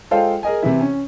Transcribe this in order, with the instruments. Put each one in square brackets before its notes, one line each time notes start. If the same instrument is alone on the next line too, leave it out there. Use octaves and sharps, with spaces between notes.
[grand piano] G#3 F4 A4 C5 F5 G5
G#4 A#4 D#5 G#5
C3 E3 E4
C#4